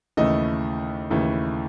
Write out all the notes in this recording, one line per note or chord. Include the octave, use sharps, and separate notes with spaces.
D#2 C#3 E3 A3 D#5
D#2 C#3 E3 A3